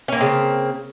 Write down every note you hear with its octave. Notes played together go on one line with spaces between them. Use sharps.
C#3 A#3 C4 C#4